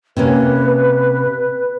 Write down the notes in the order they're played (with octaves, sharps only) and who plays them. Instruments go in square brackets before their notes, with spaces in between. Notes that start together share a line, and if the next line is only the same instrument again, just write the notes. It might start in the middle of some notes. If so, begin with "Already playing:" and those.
[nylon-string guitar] C3 A#3 C#4 [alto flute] B4